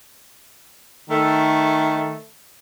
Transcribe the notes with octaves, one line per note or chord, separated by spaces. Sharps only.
D#3 A3